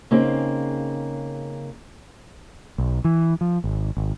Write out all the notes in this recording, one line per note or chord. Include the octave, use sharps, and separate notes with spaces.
C#3 A#3 C4 D#4 G#4
B1
E3
F3
G#1
G#1